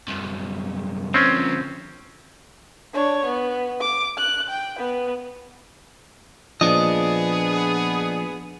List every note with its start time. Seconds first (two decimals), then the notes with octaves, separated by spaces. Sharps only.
0.08 C2 F#2
1.14 D3 F3 C4 C#4
2.93 D4 C#5
3.25 B3
3.81 D6
4.18 F#6
4.50 G5
4.78 B3 B4
6.61 A#2 F3 B3 D4 G#4 D#5